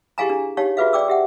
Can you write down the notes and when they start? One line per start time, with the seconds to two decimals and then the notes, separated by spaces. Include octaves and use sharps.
0.18 E4 G4 G#4 F5 G#5 A#5
0.30 D4
0.57 D#4 G4 C#5 F5 A5
0.77 F4 F#4 G#4 B4 E5 F5
0.93 D5 G5 D6 E6
1.08 G4 E5 F#5